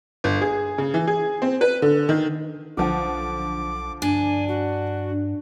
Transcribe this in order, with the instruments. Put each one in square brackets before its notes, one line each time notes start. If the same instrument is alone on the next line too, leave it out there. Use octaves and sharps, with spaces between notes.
[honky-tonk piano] G1
G#4
C#3
E3
G#4
C4
B4
D3
D#3
[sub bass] B1 [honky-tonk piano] D3 F3 F#5 [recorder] D6
[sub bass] G2 [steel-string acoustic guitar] D4 [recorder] G#5
[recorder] F#4